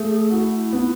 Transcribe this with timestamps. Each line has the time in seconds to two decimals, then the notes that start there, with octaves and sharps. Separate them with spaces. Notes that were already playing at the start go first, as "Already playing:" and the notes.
Already playing: A3 G#4
0.30 E4 F#4
0.73 B3